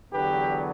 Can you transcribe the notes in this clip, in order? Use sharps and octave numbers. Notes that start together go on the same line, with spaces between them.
E2 D3 F#3 B3 G4 B4